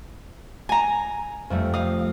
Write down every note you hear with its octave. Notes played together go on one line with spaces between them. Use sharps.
G#5 A#5
F2 G3 A3
F5 D#6